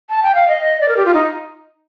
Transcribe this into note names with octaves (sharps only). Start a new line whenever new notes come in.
A5
G5
F5
D#5
D5
A#4
G4
F4
D#4